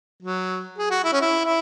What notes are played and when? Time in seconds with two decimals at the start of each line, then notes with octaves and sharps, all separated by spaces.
0.23 F#3
0.78 G#4
0.91 F#4
1.04 E4
1.13 C#4
1.21 E4
1.46 E4